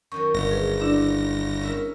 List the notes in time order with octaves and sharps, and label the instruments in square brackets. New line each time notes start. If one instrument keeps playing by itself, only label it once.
[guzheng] F#2 D#3 F#3 [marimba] C#6
[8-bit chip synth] G1 A#6
[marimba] G#4 B4
D4 E4 D5
[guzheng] C#4 A#4 E5